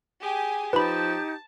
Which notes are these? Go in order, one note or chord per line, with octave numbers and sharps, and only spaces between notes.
G4 G#4 G#5
F3 D#4 G4 B4 A5 B5